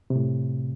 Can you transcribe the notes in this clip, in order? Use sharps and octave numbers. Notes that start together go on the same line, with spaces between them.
C3
A2